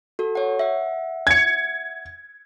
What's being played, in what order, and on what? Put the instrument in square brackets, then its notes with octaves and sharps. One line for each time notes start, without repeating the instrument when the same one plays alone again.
[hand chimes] F#4 A4
C#5 F#5
E5 F#5
[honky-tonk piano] G#6 C#7